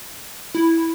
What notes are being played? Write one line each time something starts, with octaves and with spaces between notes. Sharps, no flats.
E4